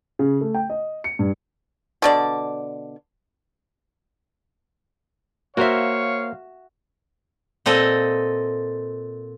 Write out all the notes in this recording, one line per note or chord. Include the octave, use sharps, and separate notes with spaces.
C#3
A3
G5
D#5
C#7
G2
B2 D3 D5
A#3 F#4 A#4 C5 C#5 E5 F5
A#2 C4 A4 D#5